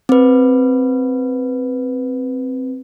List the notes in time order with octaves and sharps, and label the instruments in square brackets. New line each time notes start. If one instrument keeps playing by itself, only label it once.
[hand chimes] C4 B4